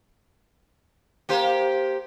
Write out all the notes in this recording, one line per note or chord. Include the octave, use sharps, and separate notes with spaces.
A#3 G4 C5